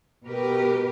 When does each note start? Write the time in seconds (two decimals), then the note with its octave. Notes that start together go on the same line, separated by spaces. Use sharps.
0.25 B2 G4 A#4 B4